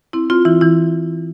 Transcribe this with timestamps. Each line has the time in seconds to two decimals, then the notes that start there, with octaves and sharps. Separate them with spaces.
0.13 C4 E4
0.30 C4 F4
0.45 E3 E4
0.61 E3 E4